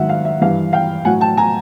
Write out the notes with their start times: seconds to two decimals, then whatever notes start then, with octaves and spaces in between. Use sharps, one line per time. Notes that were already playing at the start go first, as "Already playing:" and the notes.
Already playing: G#2 D#3 F#3 E5 F#5
0.09 F5
0.25 E5
0.41 G2 E3 F5
0.73 F5 G5
1.05 A2 F#3 F#5 G#5
1.21 G5 A5
1.37 G#5 A#5